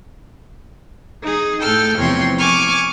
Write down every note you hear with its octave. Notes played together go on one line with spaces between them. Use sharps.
D#4 G#4
A2 A4 G5 F6
E2 C3 F3 C#5 G5 C6
G#5 C#6 D6 F6